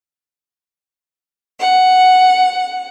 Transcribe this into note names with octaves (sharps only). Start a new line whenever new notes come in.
F#5